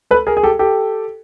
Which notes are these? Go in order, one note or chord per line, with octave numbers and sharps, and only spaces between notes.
A4 B4
G#4 A#4
G#4
G4 A4
G4 A4